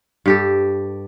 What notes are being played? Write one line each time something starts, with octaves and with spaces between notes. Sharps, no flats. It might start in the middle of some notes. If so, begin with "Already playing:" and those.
G2 G4 A4